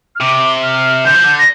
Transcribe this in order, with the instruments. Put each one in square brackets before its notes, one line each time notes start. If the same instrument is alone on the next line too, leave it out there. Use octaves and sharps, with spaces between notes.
[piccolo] F6
[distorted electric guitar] C3 [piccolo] D6
[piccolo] F6
[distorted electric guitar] D3 [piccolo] G6
[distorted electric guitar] F3
D3
[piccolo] A#6